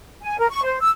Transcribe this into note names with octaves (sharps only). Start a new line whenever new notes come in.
G#5
A#4
C#6
C5
E6